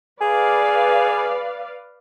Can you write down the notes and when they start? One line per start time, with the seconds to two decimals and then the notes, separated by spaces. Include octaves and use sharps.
0.21 G#4 B4 D5 F5